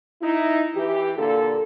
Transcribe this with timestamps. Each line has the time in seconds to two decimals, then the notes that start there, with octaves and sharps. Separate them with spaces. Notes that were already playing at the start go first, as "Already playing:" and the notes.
0.22 D#4 E4
0.76 E3 G4
1.18 A#2 D3 A#3 A4